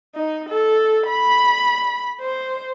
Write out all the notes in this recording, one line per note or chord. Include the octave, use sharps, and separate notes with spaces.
D#4
A4
B5
C5